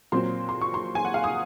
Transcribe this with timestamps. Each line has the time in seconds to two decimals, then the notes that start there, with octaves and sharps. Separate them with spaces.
0.12 A#2 F#3 C4 C6
0.49 C6
0.61 C#6
0.74 C6
0.95 G#5
1.05 F#5
1.14 F5
1.24 D#6